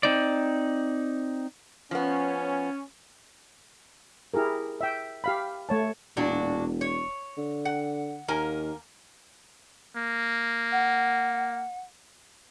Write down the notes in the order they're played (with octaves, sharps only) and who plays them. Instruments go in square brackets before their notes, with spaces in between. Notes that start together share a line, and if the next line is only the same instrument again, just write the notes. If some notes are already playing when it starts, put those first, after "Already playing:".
[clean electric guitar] C4 D#4 D5
[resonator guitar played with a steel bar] F3 B3 [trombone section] C#4
[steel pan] E4 G4 G#4 A#4
E5 G5
G4 F5 B5
A3 C#5 A5
[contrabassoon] E1 [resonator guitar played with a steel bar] A#2 D4 F#4
[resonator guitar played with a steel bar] C#5
[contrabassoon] D3
[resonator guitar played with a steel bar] F#5
[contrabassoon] D#2 [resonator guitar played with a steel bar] A#3 A#4 G#5
[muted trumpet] A#3
[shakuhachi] F#5